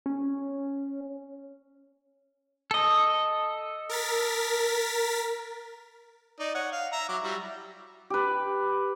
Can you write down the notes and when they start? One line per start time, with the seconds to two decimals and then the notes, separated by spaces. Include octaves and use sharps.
0.06 C#4
2.71 A4 D#5
3.89 A#4 A6 B6
6.40 D#4 D5
6.55 C#5 F#5
6.72 F5
6.92 E5 A#5
7.09 F#3 D6
7.23 F#3 G3 E4
8.10 G4 B4